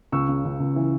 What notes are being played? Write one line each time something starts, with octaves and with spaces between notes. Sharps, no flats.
C#2 C#6 E6
C#3
C#2
C#2
E3